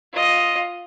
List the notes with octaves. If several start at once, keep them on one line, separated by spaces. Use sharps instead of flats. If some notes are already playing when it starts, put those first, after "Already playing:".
F4 D#5